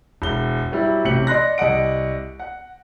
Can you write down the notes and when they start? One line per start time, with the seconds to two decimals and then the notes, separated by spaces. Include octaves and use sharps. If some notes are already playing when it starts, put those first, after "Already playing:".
0.22 E1 G7
0.72 F#3 G3 E4
1.05 A1 C3 C#7 F#7
1.27 D5 D#5 C6 F#6 A#6
1.58 C2 D5 D#5 F#5 D7
2.40 F#5